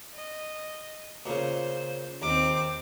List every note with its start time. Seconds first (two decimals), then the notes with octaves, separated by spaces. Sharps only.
0.14 D#5
1.26 A#2 C#3 C5
2.22 D#2 C4 D6